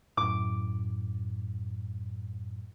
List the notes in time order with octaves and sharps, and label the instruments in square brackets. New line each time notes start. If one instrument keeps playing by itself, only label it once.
[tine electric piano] F#2 A2 [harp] D6